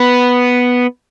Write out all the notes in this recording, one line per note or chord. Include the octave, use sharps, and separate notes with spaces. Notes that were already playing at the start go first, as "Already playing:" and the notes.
Already playing: B3